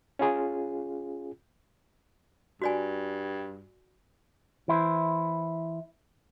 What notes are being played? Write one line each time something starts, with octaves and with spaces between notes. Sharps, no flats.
C#4 F4 G#4
G2 F#4 D5 G#5
E3 E4 C5